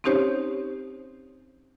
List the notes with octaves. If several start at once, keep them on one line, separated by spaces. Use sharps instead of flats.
C4 C#4 D#4 G4 C5 C#5